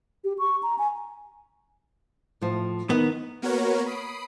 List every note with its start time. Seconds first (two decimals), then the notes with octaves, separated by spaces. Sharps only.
0.24 G4
0.39 C#6
0.63 A#5
0.78 G#5
2.41 A2 F3
2.90 D#3 B3
3.42 A#3 B3 F#4 A#4 C#5
3.86 B5 D#6 C7 D7